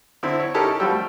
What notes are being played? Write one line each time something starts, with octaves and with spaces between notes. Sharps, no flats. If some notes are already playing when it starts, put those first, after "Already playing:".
D3 C4 E4
C#5
C#4 D#4 E4 G4 A4 A#4
A5
F3 G3 F#4 G5 E6
A3